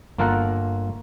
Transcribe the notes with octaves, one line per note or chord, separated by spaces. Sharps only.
G1 A#3 F4 A4 A#4 F#5